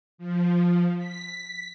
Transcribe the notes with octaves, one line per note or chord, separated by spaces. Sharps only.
F3
B6